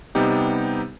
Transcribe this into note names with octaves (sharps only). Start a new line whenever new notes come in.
C3 G3 B3 D#4 G4